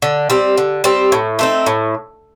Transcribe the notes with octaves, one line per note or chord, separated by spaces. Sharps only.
D3
G3 C4
D3
G3 C4
A2
A3 C4 D#4
A2